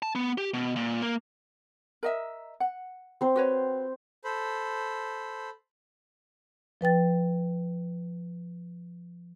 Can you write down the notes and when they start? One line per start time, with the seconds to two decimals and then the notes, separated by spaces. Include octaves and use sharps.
0.02 A5
0.15 B3
0.38 G4
0.54 B2
0.76 A#2
1.02 A#3
2.03 A#4 D#5 E5
2.60 F#5
3.21 C4 C5
3.36 F#4 B4 C#5
4.24 A4 C5 B5
6.81 F3 B4 G5 A6